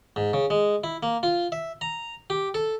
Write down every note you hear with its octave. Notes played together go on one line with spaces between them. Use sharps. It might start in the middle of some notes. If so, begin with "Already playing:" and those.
G#2
C#3
G#3
E4
A#3
F4
E5
A#5
G4
A4